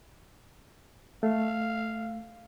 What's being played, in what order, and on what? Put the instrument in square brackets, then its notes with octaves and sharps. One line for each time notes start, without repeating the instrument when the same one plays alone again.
[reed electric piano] A3 [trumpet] F5